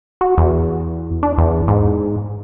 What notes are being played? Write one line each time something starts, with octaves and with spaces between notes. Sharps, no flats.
F#4
E2
D4
E2
G#2